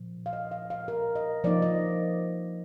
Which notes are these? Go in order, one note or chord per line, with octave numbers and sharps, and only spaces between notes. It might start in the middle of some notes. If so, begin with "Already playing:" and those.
Already playing: A#2 F3
F5
D#5
F5
F5
A#4
D#5
F3 A#3 D#4 D5
D#5